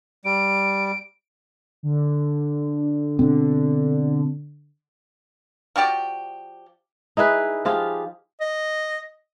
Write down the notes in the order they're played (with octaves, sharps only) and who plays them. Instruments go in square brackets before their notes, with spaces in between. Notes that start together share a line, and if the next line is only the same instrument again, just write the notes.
[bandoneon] G3 [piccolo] D7
[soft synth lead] D3
[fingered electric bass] B2 C4 [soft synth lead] D3
[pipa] F3 F#4 G4 D5
[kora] D#4 E4 G#4 B4
F3 F4 G4 G#4
[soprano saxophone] D#5